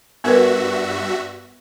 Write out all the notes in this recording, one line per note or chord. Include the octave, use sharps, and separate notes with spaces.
G2 B3 F#4 A#4 B4 E5